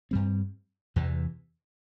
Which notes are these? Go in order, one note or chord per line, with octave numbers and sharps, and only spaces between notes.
G2 G3 C4
E2 C3 E3